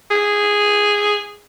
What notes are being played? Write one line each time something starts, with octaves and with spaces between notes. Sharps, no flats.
G#4